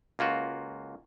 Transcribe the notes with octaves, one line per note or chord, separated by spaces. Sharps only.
C#2 A#3 F4 F#4